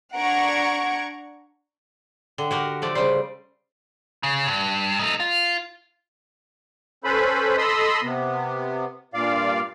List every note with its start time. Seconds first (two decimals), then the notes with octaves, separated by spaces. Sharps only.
0.15 D4 F#5 A#5 C#6 G#6 D7
2.38 D3 G5
2.51 F#4 G4 A#4
2.82 F3 A3 D5
2.95 C#3 G3 C5 D5 C6
4.23 C#3
4.47 G2
4.99 A3 D#4
5.20 F4
7.04 C#4 A4 B4 C5 B5
7.58 A4 D#5 B5 C6 D#6 E6
8.03 C3 B3
9.14 G2 A#2 D5 F5